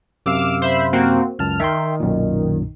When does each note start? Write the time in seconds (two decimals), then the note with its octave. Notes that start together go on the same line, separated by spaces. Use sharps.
0.26 F#2 C3 F5 D6 E6 F6
0.62 C5 E5 B5
0.93 A#3 C4 F#4
1.39 C#2 F#2 A5 F6
1.60 D#3 E5 G5 C6
2.00 B1 F#2 A#2